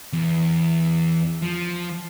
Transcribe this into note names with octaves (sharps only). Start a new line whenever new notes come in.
E2
F3